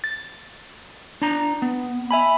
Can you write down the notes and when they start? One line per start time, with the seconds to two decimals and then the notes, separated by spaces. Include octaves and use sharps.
0.04 A6
1.22 D4 A#5
1.62 B3
2.11 E5 G#5 B5